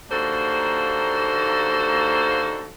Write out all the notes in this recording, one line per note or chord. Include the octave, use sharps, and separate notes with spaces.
D#2 A#3 D4 F#4 A4 C5